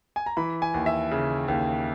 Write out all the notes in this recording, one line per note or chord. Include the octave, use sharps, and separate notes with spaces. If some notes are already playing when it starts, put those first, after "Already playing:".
G#5
A#5
E3 B5
G#5
D#2
E5
C#3
D#2